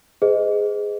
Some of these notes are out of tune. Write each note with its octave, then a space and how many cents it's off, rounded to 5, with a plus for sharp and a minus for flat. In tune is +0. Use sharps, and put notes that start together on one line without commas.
G#4 +0 C5 -40 D#5 +0